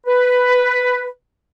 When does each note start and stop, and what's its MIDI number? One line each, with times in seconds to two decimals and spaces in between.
0.07 1.08 71